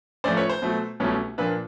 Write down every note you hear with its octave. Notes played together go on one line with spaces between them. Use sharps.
A2 F3 A3 C#4 C5 D5
B4 C#5
C5
B2 F#3 A3
C2 B2 F#3 A3 C#4
A#2 F3 A#3 D4 B4